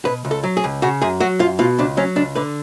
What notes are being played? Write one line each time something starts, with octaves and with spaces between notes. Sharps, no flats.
B2 B4
C#2
A4
F#3
G#4
C#2
C#3 F#4
F#2 G#4
F#3 F#4
F#2 F4
B2 F4
C#2 D4
F#3 C#4
C#2 D4
D3 B4